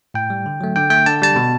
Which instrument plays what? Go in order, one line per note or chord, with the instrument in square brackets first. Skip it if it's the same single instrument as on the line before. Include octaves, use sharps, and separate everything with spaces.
[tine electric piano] A2 G5
G3
D3
F#3 A3
D3 G5
A3 G5
D3 A5
G3 A5
B2